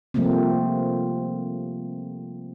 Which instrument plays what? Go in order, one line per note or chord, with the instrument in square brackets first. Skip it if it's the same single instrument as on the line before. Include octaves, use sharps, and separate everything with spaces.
[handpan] C3 F3 G3 A3 A#3 C4